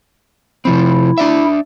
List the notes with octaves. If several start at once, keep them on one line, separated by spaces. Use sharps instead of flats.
C3 F3 C4 E4
D4 D5 E5